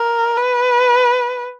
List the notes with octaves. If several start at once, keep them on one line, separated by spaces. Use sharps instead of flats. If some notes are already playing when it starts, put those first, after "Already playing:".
Already playing: A#4
B4